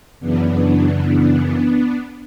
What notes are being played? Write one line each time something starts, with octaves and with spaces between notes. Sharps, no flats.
F#2 C#3 E3 B3 D4